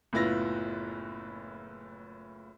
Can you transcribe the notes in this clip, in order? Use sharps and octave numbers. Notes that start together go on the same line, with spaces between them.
F#1 A2 B3 E4 F4 A#6